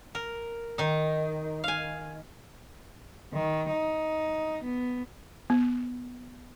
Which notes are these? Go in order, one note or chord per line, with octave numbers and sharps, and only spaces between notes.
A#4
D#3 D#4
F5 G#5
D#3
D#4
B3
B3